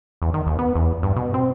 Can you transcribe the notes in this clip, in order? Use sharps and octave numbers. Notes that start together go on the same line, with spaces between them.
E2
D#3
D#2
B3
E2
G2
B2
C4